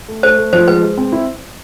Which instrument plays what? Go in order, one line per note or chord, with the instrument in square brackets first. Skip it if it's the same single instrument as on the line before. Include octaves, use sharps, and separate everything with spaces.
[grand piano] A3
[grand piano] A3 [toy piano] C5
[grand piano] A3
[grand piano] F3 [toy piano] C5
[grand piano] G#3 [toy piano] B4
[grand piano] G#3
C4
E4